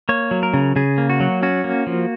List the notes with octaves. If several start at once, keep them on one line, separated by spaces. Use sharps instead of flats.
A#3 C#5
F#3
A#4
C#3
C#3 G#4
A#3
F#4
F#3
C#4 F#4
A#3
F3